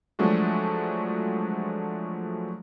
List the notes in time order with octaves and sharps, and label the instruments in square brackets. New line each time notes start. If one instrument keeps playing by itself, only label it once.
[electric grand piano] F3 F#3 G#3 A3 D4 F#4